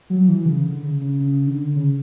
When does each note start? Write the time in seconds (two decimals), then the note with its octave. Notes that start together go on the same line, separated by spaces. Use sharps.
0.10 F#3
0.28 E3
0.46 C#3
0.65 D3
0.83 C#3
1.02 C#3
1.20 C#3
1.47 D3
1.75 C#3